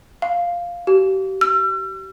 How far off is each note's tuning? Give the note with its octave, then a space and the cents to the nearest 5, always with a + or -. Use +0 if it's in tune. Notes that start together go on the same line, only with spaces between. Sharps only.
F5 +0
G4 -40
E6 +45